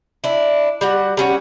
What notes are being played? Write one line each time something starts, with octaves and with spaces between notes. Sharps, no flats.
D4 E4
G3 F#4 F#5
G3 C#4 F#4